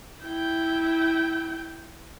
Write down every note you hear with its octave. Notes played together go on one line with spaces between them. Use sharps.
E4 G5